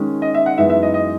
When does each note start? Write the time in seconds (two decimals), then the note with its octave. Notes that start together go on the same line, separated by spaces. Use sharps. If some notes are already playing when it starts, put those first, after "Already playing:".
Already playing: D#3 G#3 C#4
0.22 D#5
0.34 E5
0.46 F#5
0.58 F#2 E3 G#3 B3 D#4 E5
0.70 E5
0.83 D#5
0.94 D#5